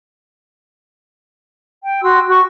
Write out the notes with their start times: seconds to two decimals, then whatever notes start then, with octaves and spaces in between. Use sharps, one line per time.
1.83 G5
2.02 F#4 C6 E6
2.28 F#4 C#6